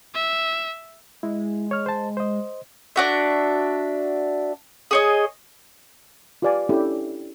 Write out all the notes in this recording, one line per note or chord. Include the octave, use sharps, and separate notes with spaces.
E5
G#3 E4
C#5 F6
C5 A5
C5 D#5
D4 F#4 E5
G#4 C#5 D#5
F4 G4 B4 D5 F5 G#5
C#4 D4 E4 G4 A4